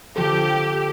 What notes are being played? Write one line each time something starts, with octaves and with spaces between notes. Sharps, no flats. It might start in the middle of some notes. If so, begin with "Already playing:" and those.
D3 F3 G4 A4